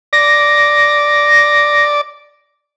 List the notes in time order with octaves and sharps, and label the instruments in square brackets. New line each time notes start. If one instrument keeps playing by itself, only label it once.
[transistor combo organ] D5 [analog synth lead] A#6